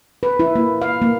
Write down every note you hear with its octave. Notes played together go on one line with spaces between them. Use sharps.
B4
E4
A#3
F5
A#3